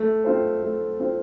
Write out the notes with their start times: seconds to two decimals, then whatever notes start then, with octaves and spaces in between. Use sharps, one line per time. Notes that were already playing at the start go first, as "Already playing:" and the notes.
Already playing: A3
0.24 C4 F4 C5
0.63 A3
1.00 C4 F4 C5